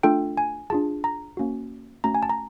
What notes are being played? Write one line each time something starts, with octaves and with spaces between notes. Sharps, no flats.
A3 D4 F4 A4 G5
G#5
D4 F4 G#4 A5
A#5
A#3 C#4 F#4
A3 C#4 F#4 A#5
G#5
A5
A#5